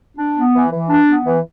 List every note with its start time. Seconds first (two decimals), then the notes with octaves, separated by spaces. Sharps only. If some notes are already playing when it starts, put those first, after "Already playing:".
0.17 D4
0.35 B3
0.53 E3
0.72 E3
0.90 D4
1.08 B3
1.26 E3